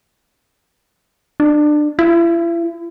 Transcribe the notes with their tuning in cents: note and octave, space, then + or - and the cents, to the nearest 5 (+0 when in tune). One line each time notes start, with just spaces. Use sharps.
D4 +25
E4 +40